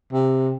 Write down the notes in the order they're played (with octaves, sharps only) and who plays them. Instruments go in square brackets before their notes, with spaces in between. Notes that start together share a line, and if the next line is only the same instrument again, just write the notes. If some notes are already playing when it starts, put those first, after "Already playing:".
[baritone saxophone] C3